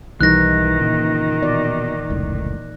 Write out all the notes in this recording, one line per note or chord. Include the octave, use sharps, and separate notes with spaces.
B1 D#3 E3 G3 D#4 F#6 A#6
A#2 C#3
B2 D5
F1 C#2 A2